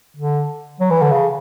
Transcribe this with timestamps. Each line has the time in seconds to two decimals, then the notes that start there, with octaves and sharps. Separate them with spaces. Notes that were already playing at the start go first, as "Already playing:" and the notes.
0.17 D3
0.80 F#3
0.90 E3
1.02 D3
1.12 C#3